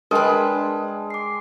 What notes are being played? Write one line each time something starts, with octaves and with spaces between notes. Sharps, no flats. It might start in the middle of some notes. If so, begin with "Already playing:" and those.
G#3 D4 A#4 B4 G5 A5 F6
D6 C7